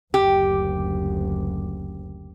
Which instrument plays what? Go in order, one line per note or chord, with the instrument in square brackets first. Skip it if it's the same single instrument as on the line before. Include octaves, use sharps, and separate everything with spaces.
[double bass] F#1 D2 [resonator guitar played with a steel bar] G4